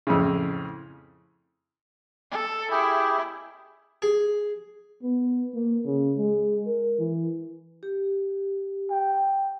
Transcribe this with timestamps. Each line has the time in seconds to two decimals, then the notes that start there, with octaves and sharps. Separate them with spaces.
0.07 F2 A2 C#3
2.31 A4
2.71 E4 G4 G#4
4.02 G#4
5.03 B3
5.54 A#3
5.85 C#3
6.17 G#3
6.67 A#4
6.99 E3
7.83 G4
8.90 G5